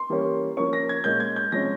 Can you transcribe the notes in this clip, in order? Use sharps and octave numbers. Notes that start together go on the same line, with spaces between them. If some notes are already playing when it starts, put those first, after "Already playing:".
Already playing: C6
E3 G3 A#3 C#4
F3 A#3 C#4 C#6
A#6
G#6
A#2 G#3 C#4 G6
G#6
G6
C3 F3 G#3 C#4 A#6